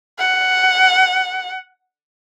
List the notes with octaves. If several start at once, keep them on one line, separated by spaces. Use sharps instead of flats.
F#5